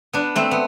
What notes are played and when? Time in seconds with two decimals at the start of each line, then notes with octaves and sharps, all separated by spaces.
0.13 B3 D4
0.36 A3 C4
0.51 B3